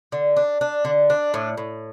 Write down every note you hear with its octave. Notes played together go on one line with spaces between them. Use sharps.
D3
D4
D4
D3
D4
A2
A2